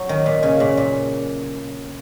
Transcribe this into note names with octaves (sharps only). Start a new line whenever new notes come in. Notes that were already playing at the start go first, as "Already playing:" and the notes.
Already playing: F#3
D#3
A#2
C#3
A#2
A#2